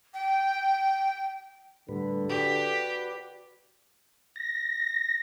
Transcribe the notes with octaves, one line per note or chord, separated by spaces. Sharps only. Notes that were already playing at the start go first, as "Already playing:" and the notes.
G5
A2 D3 G3 B4
F#4 G4 B4 D5
A#6